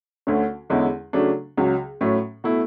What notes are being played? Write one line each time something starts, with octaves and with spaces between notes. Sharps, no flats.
D2 D3 A3 C#4
E2 D3 G#3 C#4 E4
C#3 F#3 A3 D4
C#2 C#3 F#3
A2 F#3 A3 C#4
B2 A3 E4